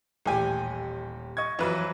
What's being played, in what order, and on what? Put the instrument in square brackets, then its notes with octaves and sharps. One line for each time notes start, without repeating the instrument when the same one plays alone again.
[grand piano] D#1 G4 [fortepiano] A1 G#5
[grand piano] D#5 C#6 G#6
[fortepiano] F2 B4 [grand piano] E3 F#3